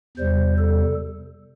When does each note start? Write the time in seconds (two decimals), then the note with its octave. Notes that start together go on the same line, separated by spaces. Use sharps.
0.17 E2 C3 G3 C5
0.58 A4